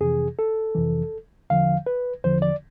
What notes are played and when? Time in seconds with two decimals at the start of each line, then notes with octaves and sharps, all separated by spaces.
0.01 F2 C3 E3 G#4
0.39 A4
0.75 F2 C3 E3
1.50 E2 D3 F3 F5
1.86 B4
2.24 E2 D3 F3 C5
2.42 D5